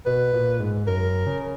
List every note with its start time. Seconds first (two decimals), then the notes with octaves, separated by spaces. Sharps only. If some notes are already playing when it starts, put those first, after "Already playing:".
0.06 B2 B4
0.34 A#2
0.60 G#2
0.87 F#2 A#4
1.26 C#3